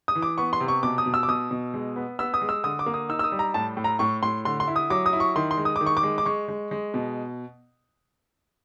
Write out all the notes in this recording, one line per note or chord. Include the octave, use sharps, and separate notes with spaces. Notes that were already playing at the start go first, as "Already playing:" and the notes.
D#6
E3
D6
B3 C#6
C6
C3
C#6
B2 D6
D#6
B2
E6
D6
B2 D#6
B2
G#3
B3
B3 E6
D#6
G#3
E6
D3 D#6
D6
A#3
D#6
D#4 E6
E6
D#6
G3
A#5
A2 A5
A2
A#5
A2 C#6
A2 C6
D3 C6
C6
E4
D#6
F#3 D6
D#6
E4
C#6
D#3 C6
C6
G#3
D#6
D6
D#3
C#6
D6
G#3
D6
G#3 C#6
G#3
G#3
B2